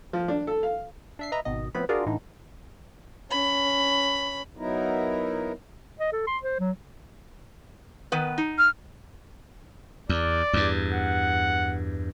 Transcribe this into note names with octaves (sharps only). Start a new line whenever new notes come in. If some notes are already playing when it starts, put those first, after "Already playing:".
F3
D4
A4
F5
D4 E5 C7
B4 D#5 E5 A#5
G#1 B2 D#3 D#5
A2 F3 B3 C4 B5
D4 F4 F#4 G#4 A#4 D5
A2 D3 E3 D#4
C#4 B5
F#3 B3 D#4 E4 A#4
D#5
A4
C6
C5
F#3
D#3 B3 B4
D#4
F6
E2 D5
E2 G2
F#5